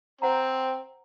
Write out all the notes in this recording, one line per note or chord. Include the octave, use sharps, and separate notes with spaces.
C4 C5 F#5 A#5